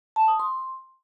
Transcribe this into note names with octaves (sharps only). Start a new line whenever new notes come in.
A5
D#6
C6